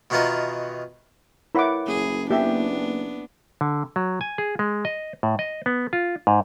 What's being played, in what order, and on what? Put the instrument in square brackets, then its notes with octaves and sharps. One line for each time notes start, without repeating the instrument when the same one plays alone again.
[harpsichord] B2 D#3 E3 B3 F4 A#4
[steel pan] E4 F#5 D6 [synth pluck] A#4 C#5 B5
[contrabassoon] F#1 [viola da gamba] G#4
[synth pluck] A#3 E4 [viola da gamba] B3 D4 [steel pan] G4 E5
[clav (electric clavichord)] D3
F#3
G#5
G#4
G#3
D#5
A2
D#5
B3
F4
G#2